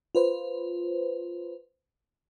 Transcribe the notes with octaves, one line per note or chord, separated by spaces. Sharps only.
F4 B4 C5